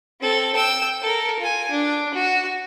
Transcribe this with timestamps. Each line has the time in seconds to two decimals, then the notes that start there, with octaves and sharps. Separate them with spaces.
0.21 C4 A4
0.55 G5 E6
1.02 A4 A#4
1.39 F4 G#5
1.71 D4
2.14 F#4